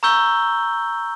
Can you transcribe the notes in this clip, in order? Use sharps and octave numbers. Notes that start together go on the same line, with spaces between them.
A#5 C#6 E6 G6 G7